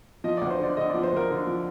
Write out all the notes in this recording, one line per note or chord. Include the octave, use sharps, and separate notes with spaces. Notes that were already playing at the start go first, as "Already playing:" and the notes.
F3 D#5
D2 D5
C5
D3 D5
D3 D#5
F3 D5
C5
D2 A#4
D3
F3